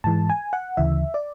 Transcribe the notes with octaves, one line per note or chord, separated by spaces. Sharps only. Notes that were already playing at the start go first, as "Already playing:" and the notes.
G#2 E3 G#3 A5
G#5
F#5
D2 C#3 E3 E5
D5